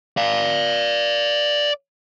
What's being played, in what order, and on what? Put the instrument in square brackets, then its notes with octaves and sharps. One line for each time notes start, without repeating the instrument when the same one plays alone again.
[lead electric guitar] D5 F5